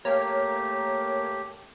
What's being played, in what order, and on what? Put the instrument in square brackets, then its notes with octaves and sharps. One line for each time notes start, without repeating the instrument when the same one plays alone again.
[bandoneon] A3 G4 [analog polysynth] A#3 [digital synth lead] C#5